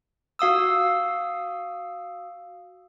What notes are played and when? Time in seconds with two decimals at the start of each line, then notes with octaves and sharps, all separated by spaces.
0.39 F#4 F5 D#6 E6